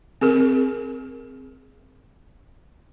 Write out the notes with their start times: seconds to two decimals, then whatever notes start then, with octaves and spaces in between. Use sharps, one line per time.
0.21 C4 G#4 A#4